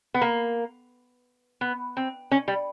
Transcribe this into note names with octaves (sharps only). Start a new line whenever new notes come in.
B3
A#3
B3
C4
C#4
G3